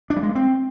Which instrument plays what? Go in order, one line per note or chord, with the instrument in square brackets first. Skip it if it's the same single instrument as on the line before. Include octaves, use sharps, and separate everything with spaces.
[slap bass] D4
G3
G#3
A#3
C4